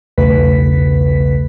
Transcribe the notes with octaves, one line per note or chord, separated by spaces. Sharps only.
B1 E2 C#3 A3 B4 B6